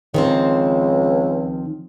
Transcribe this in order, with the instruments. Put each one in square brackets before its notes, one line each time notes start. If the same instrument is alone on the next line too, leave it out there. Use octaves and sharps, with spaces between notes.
[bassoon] C#2 [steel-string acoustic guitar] D#3 F3 C4